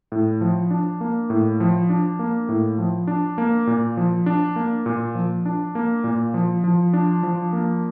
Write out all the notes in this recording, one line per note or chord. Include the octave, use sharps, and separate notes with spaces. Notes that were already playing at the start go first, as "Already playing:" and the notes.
A2
F3
D4
A#3
A2
F3
D4
A#3
A2
F3
D4
A#3
A#2
F3
D4
A#3
A#2
F3
D4
A#3
A#2
F3
F3
D4
F3
A#3